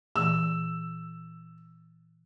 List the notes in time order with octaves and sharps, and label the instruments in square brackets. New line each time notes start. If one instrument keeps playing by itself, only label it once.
[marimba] A#2 E3 [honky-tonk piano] E6